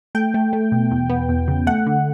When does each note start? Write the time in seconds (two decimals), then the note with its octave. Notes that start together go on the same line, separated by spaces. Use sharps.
0.15 A3 G5
0.34 A3
0.53 A3
0.72 B2
0.91 E2
1.10 B3
1.29 E2
1.48 C#3
1.67 A3 F#5
1.86 D3